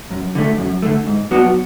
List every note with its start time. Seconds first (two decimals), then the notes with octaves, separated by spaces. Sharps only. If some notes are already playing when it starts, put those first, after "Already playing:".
0.11 F#2
0.35 D3 A3
0.58 F#2
0.82 D3 A3
1.07 G#2
1.31 F#3 B3 D4 F#4